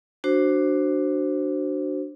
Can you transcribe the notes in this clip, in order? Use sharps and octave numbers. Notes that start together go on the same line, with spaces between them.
D4 F#4 C5